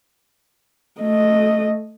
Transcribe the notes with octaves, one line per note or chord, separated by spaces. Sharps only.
A3 D#5